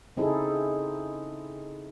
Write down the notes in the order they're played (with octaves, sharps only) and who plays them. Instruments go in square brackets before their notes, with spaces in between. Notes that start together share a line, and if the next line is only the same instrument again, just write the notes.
[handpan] C#3 C4 D#4 E4 G#4 A4